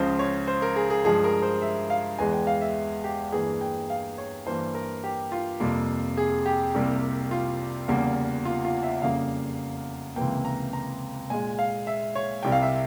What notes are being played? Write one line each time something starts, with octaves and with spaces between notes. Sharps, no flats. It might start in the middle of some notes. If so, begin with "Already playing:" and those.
Already playing: C#2 C#3 F3 C5
C#5
C5
A#4
G#4
G#4
G2 F3 G#3 G#4
A#4
C5
E5
F5
E2 E3 G#3 G#5
G5
F5
E5
G4
G2 E3 A#3 G#4
G5
F5
C#5
G2 E3 A#3 C5
A#4
G4
F4
F2 C3 G3 A#3
G#4
G4
C2 C3 G3 A#3
F4
E2 C#3 G3 A#3
F4
F4
E5
F2 C#3 G3 A#3 F5
C#2 C3 E3 A#3 G5
A#5
A#5
A#2 G#3 G#5
F5
E5
C#5
C2 C3 G3 G5
F5
E5